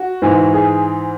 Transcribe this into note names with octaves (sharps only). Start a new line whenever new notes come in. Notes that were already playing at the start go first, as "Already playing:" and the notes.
Already playing: F#4
G#2 E3
G#4